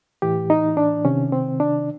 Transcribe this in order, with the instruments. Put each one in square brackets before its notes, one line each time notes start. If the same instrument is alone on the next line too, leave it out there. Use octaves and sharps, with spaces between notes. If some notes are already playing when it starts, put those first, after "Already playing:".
[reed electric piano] A2 E3 G4
D#4
D4
C3 D#3 C#4
C4
D4